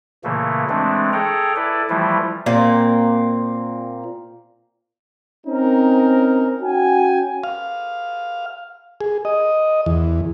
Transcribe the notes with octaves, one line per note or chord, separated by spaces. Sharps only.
A#2 C#3 E3 A3 A#3
E3 G#3 A3 C4 D4
G#4 A4 C#5 G5 A#5
E4 A4 B4 D5
E3 F3 G3 A3 E4 F4
A#2 A#3 C4
C4 C#4 D#4 A#4
C#4 F#4 G5 G#5
F5
G#4
D#5
E2